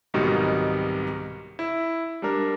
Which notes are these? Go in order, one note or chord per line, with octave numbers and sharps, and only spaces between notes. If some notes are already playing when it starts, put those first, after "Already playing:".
C2 G#2 B2 D#3 F#3 G3
E4
G3 D4 A#4